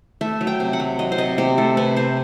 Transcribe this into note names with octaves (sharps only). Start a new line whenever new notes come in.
A3 E5
F#3
G5
C3
F#5
F#3
F#3 D#5
C5
C3 D#5
C3 G4
A3 A4
C3 B4
C3 C5